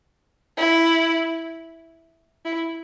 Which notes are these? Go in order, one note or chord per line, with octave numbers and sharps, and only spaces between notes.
E4
E4